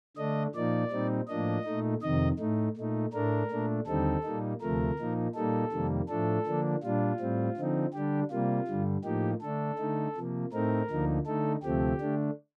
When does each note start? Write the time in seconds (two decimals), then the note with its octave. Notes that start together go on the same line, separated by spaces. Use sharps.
0.17 D3 A3 D4 D#5
0.55 A#2 F3 A#3 D#4 D5
0.91 A#2 G3 C4 D#4
1.28 A2 F3 A#3 D4 D#5
1.65 A#2 A3 D#4
2.02 F2 C3 D#3 D#5
2.39 A2 A3 D#4
2.76 A#2 A3 D#4
3.13 A2 A3 D4 A#4
3.50 A#2 A3 D4
3.87 D#2 D3 G3 C4 D#4 A4
4.24 A#2 G3 A#3 D#4
4.61 D2 C3 F3 A3 A#4
4.98 A#2 F3 A#3 D#4
5.35 A#2 G3 A#3 D#4 A4
5.72 F2 C3 D#3 G3 A#3
6.09 A2 F3 A3 D4 A4
6.46 D3 F3 A#3 D4
6.83 A#2 G3 D4 F4
7.20 A2 G3 C4
7.57 D3 F3 C4 D#4
7.94 D3 G3 D4 G4
8.31 C3 G3 A#3 F4
8.68 G2 D3 G3
9.04 A2 F3 A#3 D#4 G4
9.42 D3 A3 D4 A4
9.78 D3 A3 D#4
10.16 C3 F3 A#3
10.53 A2 A3 C4 D#4 A#4
10.90 D2 D3 F3 A#3 D#4
11.27 D3 A3 D#4 A4
11.63 D2 C3 F3 A3 C4 G4
12.00 D3 A3 D4